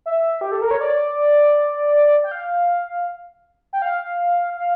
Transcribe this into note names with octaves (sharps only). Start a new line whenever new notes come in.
E5
G4
A4
A#4
C#5
D5
G5
F5
G5
F5
F5